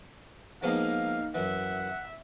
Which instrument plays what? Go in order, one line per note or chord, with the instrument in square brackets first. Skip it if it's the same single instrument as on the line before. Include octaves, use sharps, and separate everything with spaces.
[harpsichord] F3 G#3 B3 [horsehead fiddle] A#3 D#4 [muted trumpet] F5
[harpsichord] F#2 E3 [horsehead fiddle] E5 [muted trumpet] F#5